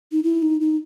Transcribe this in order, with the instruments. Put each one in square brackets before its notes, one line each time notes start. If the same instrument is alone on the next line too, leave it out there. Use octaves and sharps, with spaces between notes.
[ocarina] D#4
E4
D#4
D#4